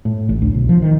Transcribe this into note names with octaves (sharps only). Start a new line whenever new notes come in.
A2
A1
D2
B1
F3
D#3